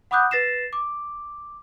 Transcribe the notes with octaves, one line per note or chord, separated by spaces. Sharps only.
F#5 B5 D6 D#6 F#6 G6
B4 A6 A#6 C7 E7
D6